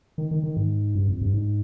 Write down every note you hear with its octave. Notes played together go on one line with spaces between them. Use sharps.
D#3
D#3
D#3
G#2
G2
F2
G2
G#2